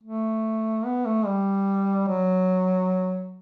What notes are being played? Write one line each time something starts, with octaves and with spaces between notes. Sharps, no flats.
A3
B3
A3
G3
F#3